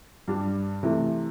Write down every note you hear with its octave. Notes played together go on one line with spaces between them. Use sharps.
G2 G3 D4
C3 E3 A3